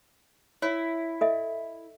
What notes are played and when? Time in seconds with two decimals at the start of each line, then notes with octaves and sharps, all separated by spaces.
0.62 E4 C#5
1.21 A4 D#5 E5